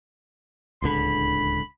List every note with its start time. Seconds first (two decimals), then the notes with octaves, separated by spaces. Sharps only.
0.82 D1 C#2 D3 B5